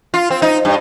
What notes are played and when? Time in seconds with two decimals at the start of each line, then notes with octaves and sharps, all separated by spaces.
0.14 F4
0.30 C4
0.42 D#4
0.65 G2